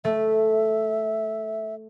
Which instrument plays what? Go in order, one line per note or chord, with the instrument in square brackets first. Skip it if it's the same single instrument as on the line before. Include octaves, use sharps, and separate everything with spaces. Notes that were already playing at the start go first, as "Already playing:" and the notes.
[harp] A3 [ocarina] E5